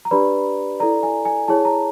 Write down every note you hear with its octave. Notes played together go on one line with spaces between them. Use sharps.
A#5
D4 G4 B4 D5 B5
E4 A4 D5 A#5
G#5
G#5
E4 G#4 C#5 A5
A#5